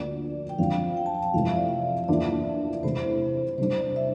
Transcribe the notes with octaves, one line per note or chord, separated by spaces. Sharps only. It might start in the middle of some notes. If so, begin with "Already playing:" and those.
Already playing: D2 D3 F3 A#3 D5
G5
F2 D3 F3 C4 F5
G5
A5
G5
F2 C3 E3 A3 F5
E5
D5
E5
E5
E2 E3 A#3 D4 F4 D5
C3 E3 A3 E4 C5
C3 G3 D4 C5
D5
E5